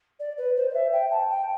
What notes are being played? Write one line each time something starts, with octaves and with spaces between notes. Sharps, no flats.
D5
B4
C5
D5
E5
G5
A5
G5